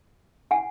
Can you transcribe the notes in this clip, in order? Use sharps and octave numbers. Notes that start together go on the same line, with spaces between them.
F#5 G#5